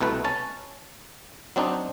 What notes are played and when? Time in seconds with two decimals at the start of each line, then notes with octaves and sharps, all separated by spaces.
0.01 C2 B2 A3 B4
0.24 C#4 A5
1.56 F#3 C4 D4 D#4